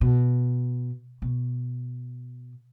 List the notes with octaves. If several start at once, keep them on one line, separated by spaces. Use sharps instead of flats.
B2
B2